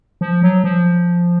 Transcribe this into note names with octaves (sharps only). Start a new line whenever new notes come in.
F3
F#3
F3